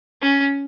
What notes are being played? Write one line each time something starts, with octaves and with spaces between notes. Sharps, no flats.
C#4